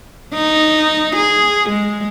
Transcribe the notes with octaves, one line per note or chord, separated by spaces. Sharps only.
D#4
G#4
G#3